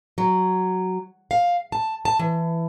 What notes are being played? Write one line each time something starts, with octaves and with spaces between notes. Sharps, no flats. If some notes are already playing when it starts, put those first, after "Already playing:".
F#3
F5
A5
A5
E3